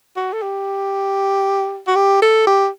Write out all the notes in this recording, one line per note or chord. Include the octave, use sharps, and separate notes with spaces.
F#4
A4
G4
F#4
G4
A4
G4